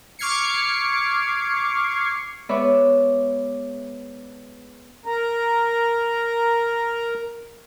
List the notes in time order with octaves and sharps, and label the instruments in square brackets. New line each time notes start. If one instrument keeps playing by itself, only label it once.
[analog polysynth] C#6 D6 F6 G#6 C7 C#7
[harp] G#3 B3 B4 C#5 D5 E5
[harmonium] A#4 A#5